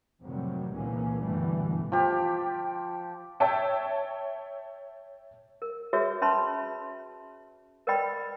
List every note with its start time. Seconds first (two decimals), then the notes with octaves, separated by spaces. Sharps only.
0.22 F2 A2 C3 D#3 F#3 G3
0.73 C#2 A#2 D3 E3 A#3 C#4
1.22 G2 B2 D3 E3 G3 A3
1.92 F3 G4
3.40 C#5 E5 G5 A5 E6
5.62 A#4
5.93 F#4 G#4 A#4 B4 C#5 E5
6.22 C#4 B4 E5 A5 B5 C6
7.87 A#4 B4 D5 D#5 G5 B5